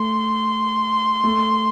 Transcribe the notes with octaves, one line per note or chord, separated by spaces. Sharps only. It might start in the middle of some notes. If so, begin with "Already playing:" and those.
Already playing: A3 C6
A3